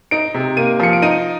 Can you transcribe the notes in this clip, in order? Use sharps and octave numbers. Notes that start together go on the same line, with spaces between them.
D#4 D7
C3
A#3 D#7
F3 C#7
D7
D#4 D#7